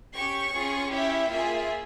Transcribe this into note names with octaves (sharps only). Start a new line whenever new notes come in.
C#4 G4 C#6
C#4 F4 G#4
C#4 E4 G4 E5
A#3 F4 G#4 E5